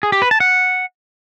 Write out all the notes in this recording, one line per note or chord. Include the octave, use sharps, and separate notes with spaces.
G#4
G4
B4
A5
F#5